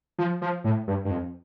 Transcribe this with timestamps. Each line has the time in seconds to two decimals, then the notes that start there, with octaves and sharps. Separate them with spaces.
0.18 F3
0.42 F3
0.64 A2
0.87 G2
1.05 G2
1.10 F2